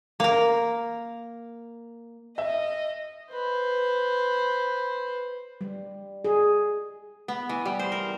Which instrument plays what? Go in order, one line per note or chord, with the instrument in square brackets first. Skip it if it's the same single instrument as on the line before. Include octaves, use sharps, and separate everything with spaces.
[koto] A#3 A#4
[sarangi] D#5 [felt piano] E5
[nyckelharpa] B4 C5
[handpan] G3
G#4
[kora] B3
E3
G3
C5
A#4